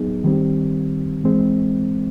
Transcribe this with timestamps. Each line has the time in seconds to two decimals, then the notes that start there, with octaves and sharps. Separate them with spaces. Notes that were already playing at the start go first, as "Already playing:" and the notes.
Already playing: F#3 B3 D#4 G#4
0.24 D#3 G3 C4
1.24 E3 G#3 C4